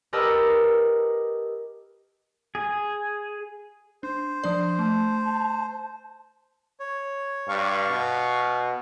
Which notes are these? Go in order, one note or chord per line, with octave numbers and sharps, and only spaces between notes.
G4 A#4 B4 D#5 A5 E6
G#4
D4 C5
F3 D4 D5
A3 A5
C#5
G2 F5 C#6
B2